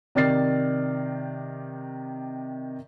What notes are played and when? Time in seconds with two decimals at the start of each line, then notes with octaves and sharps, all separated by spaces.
0.15 C3 D#3 D5 F6 A6 C7